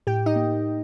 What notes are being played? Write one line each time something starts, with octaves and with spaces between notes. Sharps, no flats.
A2 G4 G5
D#4 D#5
A#3